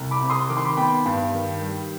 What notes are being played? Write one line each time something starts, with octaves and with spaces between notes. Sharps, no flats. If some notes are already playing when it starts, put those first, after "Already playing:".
Already playing: C2
B5 D6
C3
C6 D#6
D#3 D6
C6
B5 D6
B3 G5 B5
G2
D#3
G3